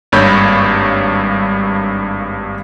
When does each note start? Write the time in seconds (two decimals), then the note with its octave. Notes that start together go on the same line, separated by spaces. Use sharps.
0.12 G#1 G2 A#3 C#5 B5 G6